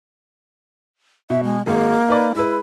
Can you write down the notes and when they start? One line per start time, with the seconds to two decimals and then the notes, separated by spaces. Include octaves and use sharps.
1.30 B2 E5
1.43 G#3
1.66 G#1 G#3 A#3
2.08 D#4 B4 D5
2.35 G#3 E4 B4